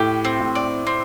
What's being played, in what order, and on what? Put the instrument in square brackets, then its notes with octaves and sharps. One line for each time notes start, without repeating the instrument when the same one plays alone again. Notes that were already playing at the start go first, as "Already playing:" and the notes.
Already playing: [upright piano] A2 [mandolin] G4
[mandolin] C4
[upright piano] A2
[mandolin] D5
C4